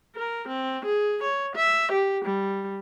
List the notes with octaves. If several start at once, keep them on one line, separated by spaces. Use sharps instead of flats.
A#4
C4
G#4
C#5
E5
G4
G3